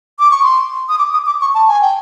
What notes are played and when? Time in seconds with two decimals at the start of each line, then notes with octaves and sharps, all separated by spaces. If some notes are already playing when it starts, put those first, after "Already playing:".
0.19 D6
0.31 C#6
0.43 C6
0.89 D#6
0.98 D6
1.13 D#6
1.26 D6
1.41 C#6
1.54 A5
1.68 G#5
1.81 G5